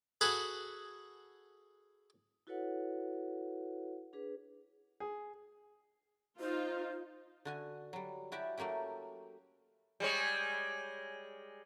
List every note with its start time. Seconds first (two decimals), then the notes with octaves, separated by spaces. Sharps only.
0.21 F#4 G#4 A4 B4 F#5 G#5
2.47 E4 F#4 A4 B4 C#5 F#5
4.13 D4 G#4 B4
5.00 G#4
6.40 D#4 F4 C5
7.45 D3 F#4 G#5
7.93 F#3 G3
8.32 E4 F#4 G4 D5 E5 A5
8.57 F#3 A3 A#3 C#4 G4
10.00 G3 G#3 C#5